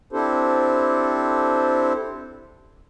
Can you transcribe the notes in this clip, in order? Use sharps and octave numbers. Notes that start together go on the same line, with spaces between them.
C4 D4 E4 G4 A4 C5